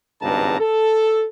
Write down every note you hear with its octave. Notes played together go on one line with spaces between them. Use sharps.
G#1 C#2 G2 B3 A5 A#5
A4